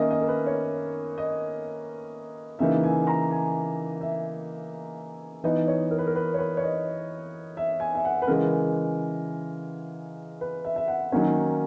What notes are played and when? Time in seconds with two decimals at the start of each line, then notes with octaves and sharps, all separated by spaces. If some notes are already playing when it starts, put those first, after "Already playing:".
Already playing: D#3 A#3 C#4 D#5 E5
0.11 D#5
0.22 A#4
0.28 B4
0.46 C#5
1.18 D#5
2.59 C#3 E3 A#3 D#4 E5
2.84 G#5
3.07 A#5
3.31 G#5
4.01 E5
5.44 E3 B3 D#4 D#5
5.68 C#5
5.91 A#4
5.98 B4
6.07 A#4
6.15 B4
6.34 C#5
6.39 B4
6.57 C#5
6.63 D#5
7.57 E5
7.80 G#5
7.95 E5
8.05 F#5
8.22 B4
8.27 C#3 E3 G#3 A#4
10.41 B4
10.65 E5
10.76 E5
10.88 F#5
11.12 D#3 F#3 A#3 C#4